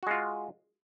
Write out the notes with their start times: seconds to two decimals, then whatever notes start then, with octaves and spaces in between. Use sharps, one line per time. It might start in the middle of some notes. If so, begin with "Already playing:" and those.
0.03 F#4
0.07 G#3
0.11 F4